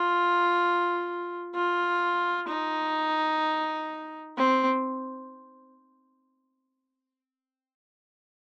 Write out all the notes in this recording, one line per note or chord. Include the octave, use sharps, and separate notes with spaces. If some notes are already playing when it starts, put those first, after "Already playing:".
Already playing: F4
F4
D#4
C4